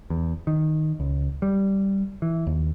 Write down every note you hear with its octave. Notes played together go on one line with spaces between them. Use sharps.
E2
D#3
C#2
G3
E3
D#2